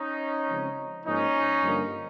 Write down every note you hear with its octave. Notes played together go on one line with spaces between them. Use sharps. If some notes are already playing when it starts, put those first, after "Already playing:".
Already playing: C#4 D#4
C#3 F3 G#3 C4
G#2 F3 A#3 C#4 D#4
G2 D3 F3 A#3